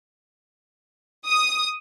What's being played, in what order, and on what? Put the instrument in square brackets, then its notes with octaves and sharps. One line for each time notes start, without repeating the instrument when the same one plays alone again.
[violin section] D#6